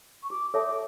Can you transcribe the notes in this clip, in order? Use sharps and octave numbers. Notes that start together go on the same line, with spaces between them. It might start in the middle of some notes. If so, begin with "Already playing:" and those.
C#6
F#4 D6
A4 C#5 E5 A5 D6
D6